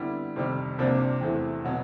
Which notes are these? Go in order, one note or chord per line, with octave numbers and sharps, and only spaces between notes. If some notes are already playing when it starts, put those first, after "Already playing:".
Already playing: D3 G3 B3 E4
F2 C3 D#3 G3
C2 C3 F3 A#3 D4
E2 C3 E3 A3
B2 F#3 B3